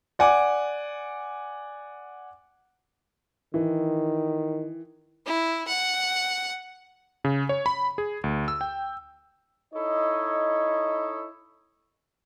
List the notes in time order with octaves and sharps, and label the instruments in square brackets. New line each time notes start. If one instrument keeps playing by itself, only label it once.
[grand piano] D5 F#5 G#5 D6
[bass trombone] D#3 [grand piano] E3
[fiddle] E4
F#5
[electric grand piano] C#3
C#5
B5
G#4
D2
E6
G5
[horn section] D#4 E4 A4 C#5 D#5